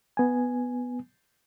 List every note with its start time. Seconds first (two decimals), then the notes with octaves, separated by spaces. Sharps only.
0.17 B3 G#5